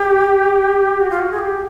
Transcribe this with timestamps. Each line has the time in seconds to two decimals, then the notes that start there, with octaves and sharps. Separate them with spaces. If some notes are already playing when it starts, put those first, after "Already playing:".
Already playing: G4
1.00 F#4
1.10 F4
1.19 F#4
1.31 G#4
1.39 G4